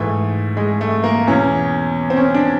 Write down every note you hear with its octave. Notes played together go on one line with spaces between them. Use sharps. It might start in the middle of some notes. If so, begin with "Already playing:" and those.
Already playing: G#2 E3 A3
G#3
A3
A#3
E2 B2 C#4
C4
C#4
D4